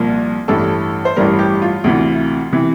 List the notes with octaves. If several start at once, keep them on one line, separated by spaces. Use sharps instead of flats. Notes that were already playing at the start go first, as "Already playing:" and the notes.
Already playing: C2 A#2 F3 A#3
A1 G2 E3 G3 A4
C5
A1 G2 E3 G3 A#4
G4
F4
D2 C3 E3
C3 E3